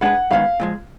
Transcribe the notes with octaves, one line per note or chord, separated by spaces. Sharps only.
G#3 D4 G#4 B4 F#5
F#2 D#3 G#3 B3 F5
A#2 F3 G#3